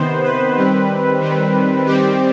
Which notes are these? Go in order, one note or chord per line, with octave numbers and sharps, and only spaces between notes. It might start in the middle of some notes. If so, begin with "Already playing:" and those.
Already playing: C3 D#3 B3 C5
B4
D#3 G3 C4
D#3 G3 C4
D#3 G3 C4 G4